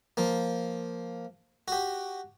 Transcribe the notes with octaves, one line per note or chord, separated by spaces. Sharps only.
F3 A#3
F#4 G4